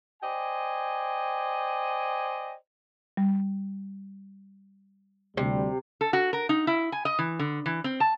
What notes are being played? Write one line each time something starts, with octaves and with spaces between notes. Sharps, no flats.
C5 D5 D#5 G5 G#5
G3
D2 C3 G3
A4
F#4
A#4
D#4
E4
G#5
D#5
E3
D3
E3
C4
A5